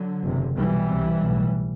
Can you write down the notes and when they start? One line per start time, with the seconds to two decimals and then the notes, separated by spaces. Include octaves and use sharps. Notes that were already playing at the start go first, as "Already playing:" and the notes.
Already playing: D3 F#3
0.24 F#1 E2 C3
0.56 B1 B2 E3 G3
0.89 C2 C3
1.21 B1 A2